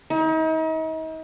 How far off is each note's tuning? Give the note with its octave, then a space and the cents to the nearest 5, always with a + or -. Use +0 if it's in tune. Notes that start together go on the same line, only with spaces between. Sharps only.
D#4 +40